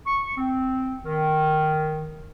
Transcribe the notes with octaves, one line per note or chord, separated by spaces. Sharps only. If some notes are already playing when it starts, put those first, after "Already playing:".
C#6
C4
D#3